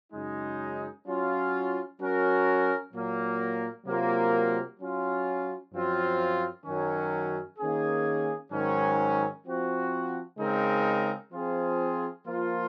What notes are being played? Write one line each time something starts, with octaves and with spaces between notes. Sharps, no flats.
F#2 C#3 G#3 D#4
F#3 C#4 F4
F#3 C#4 F#4 A#4
A#2 F#3 A#3
C3 F#3 A#3 F4 A#4
F#3 C#4 F4
F#2 F3 C4 F4
F#2 D#3 F#3 C#4
D#3 A#3 C#4 G#4
G#2 D#3 F#3 C#4
F3 C4 F#4
C#3 G#3 C4 D#4 A#4
F3 C4 F4 G#4
F3 A#3 F4